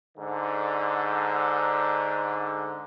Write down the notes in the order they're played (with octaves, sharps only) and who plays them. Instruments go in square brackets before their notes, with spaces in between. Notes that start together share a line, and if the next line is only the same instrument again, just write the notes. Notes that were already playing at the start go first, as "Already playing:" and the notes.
[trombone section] G#2 D3